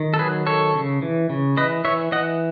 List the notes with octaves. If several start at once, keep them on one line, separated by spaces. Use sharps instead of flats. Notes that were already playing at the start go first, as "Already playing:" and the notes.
Already playing: D#3
A4
F#3 G#4 B4
D#3 A4 C#5
C#3
E3
C#3
E3 B4 D#5
E3 C#5 E5
E3 D#5 F#5